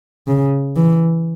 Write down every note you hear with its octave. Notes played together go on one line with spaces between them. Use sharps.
C#3
E3